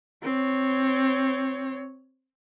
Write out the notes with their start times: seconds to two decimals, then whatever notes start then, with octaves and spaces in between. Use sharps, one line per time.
0.23 C4 C#5